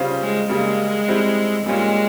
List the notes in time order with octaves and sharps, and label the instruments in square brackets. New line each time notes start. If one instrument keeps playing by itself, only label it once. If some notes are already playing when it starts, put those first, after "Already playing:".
Already playing: [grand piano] C#3 G3 C#4 F4 C5
[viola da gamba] G#3
[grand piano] C#3 G3 A#3 [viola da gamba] G#3
[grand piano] G3 C4 E4
[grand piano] A#2 G3 C#4 F4 [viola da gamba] G#3